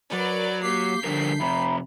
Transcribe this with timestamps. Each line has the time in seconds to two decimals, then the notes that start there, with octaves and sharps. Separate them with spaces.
0.13 F#3 A#4 B4 D5
0.63 A#3 G4 D6 G6 B6 C7
1.04 D3 F3 G3 D4 A#4
1.40 F2 C3 E5 A#5 B5